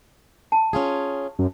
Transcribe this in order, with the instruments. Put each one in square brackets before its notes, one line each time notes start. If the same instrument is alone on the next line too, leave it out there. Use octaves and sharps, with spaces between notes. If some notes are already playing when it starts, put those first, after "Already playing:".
[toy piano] A5
[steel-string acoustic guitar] C#4 F4 G#4
[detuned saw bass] F#2